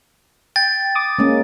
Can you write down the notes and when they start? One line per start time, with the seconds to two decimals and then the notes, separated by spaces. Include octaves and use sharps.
0.56 G5 A6
0.95 D6 D#6
1.19 G#3 A#3 C#4